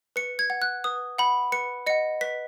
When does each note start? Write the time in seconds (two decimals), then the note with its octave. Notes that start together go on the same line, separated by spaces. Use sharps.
0.16 B4 C#7
0.39 G#6
0.50 F#5
0.62 F#6
0.84 B4 D#6
1.18 F#5 B5
1.52 B4 C#7
1.86 D#5 F#5 C#7
2.21 B4 B6